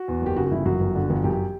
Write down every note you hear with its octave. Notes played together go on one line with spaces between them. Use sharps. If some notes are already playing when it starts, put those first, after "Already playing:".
Already playing: F#4
E2
F#1 G4
C#3 F#4
F#4
G1 E4
F#2 F#4
G1
D3
G1
F#2 G4